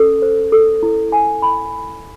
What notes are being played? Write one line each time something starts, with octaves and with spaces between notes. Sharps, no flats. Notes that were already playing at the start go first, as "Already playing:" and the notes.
Already playing: C#4 A4
C5
A4
E4
G#5
B5